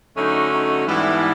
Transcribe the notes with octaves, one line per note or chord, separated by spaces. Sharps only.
D3 F#3 A3 C#4 D#4
D#4
G#2 E3 G3 B3 D4 E4